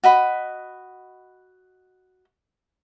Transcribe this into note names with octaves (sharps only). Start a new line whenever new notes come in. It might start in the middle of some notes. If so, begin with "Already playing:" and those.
F#4 D#5 B5